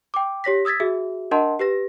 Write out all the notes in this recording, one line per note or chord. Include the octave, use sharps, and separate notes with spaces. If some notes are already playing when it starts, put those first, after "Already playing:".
G5 D6
G4 C#5 A#6 B6
D#6 E6 G#6 A6 B6
F#4 G#4 E5
D4 A#4 D#5 F#5 A5 C6
G4 B4 A#6